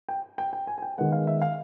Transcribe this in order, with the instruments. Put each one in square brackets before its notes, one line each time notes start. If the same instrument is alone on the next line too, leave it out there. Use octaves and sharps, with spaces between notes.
[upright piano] G5
G5
G5
G#5
G#5
G5
[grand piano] D#3 G#3 B3 [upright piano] F#5
[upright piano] F5
E5
F5